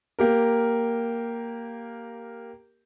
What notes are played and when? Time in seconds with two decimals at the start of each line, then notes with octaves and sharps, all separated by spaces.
0.19 A#3 G4 A#4